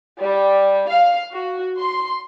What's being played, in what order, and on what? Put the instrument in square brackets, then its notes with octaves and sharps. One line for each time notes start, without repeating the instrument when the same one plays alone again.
[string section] G3
F5
F#4
C6